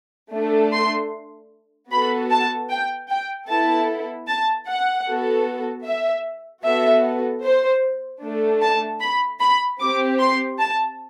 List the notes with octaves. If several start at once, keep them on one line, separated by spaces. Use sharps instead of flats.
A3 D4 A4
C6
B3 F#4 A4 B5
A5
G5
G5
B3 E4 A4 A5
A5
F#5
B3 F#4 A4
E5
B3 F#4 A4 E5
C5
A3 D4 A4
A5
B5
B5
C4 G4 D6
C6
A5